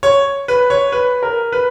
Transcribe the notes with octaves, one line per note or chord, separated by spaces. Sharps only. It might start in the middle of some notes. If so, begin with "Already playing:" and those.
C#5
B4
C#5
B4
A#4
B4